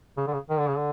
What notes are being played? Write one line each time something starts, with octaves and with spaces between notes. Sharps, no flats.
C#3
D3
C#3
D#3
D3
C#3
D3